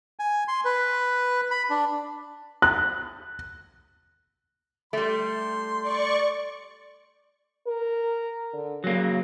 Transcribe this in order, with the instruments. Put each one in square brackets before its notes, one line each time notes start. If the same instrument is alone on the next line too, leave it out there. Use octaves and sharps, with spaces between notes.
[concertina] G#5
C6
B4
B5
D4
[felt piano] F#6
[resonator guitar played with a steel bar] G3 A3 [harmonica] C6
[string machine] D5 C#6
[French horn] A#4
D3
[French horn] C#3 [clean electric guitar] F#3 A#3